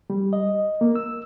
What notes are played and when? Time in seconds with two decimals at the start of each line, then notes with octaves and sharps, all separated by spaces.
0.10 G3
0.33 D#5
0.81 A#3
0.95 E6